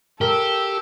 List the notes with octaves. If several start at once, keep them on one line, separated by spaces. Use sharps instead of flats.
G4 A4 A#4 E6